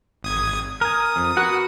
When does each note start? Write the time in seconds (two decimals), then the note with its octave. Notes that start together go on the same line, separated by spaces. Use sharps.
0.23 G#1 D#6 G#6
0.81 A#4 G#5 D#6
1.16 F2
1.37 F#4 A#4 B4 F#5